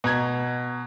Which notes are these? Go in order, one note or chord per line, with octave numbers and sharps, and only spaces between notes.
B2 A#5 G#6